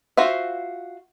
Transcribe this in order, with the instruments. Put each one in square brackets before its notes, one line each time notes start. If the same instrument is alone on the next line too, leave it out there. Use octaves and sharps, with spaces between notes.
[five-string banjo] F4 F#4 C5 E5